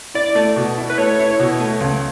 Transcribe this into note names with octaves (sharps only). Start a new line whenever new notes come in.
E4 D5
A3
B2
E4
B4
A3 C#5
E4
B2
A3
C#2